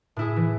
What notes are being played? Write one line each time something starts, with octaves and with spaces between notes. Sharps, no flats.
A2 E4 G#4
E3